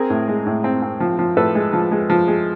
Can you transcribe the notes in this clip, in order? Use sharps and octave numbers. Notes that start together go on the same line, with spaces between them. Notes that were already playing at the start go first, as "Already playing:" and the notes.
Already playing: C4 G#4 A#4
A2
G#3
A2
C4
C4
F3
F3
A2 A4 B4
G#3
F3
G#3
F3
G#3